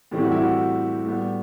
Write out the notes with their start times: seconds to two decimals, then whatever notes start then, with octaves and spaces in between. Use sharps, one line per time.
0.11 A2 E3 G3 C4 G4
0.21 F#4
0.32 E4
0.41 F#4
1.05 A2 G3 B3